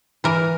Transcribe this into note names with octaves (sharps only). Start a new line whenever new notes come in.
E3 A#4